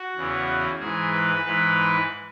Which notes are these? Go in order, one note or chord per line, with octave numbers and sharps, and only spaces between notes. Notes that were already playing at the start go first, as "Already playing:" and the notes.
Already playing: F#4
E2 C#3 E3
G#2 E3 G#4
B4
G#2 E3 B4